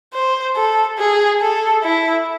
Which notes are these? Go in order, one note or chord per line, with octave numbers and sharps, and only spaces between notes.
C5
A4
G#4
A4
E4